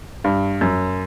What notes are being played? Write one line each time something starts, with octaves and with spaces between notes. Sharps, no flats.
G2
F#2